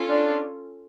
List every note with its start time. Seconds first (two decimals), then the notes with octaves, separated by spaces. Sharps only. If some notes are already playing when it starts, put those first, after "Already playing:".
Already playing: C#4 F4 A4
0.09 D4